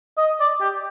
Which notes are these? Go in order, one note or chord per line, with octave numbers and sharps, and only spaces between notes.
D#5
D5
G4